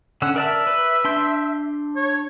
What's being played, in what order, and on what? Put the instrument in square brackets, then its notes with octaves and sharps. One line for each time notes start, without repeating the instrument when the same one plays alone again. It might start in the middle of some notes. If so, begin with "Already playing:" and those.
[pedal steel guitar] D3 C#4 E6 [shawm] F#5
[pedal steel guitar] A#4 D5 A5 [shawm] E5
[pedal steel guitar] B4
D4 C6 G6
[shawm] C#5